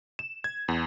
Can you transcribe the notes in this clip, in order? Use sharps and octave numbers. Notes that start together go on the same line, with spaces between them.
E7
G#6
E2